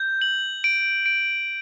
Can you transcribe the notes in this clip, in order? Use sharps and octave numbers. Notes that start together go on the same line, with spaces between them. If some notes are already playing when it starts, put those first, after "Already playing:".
Already playing: G6
F#7
D7
D7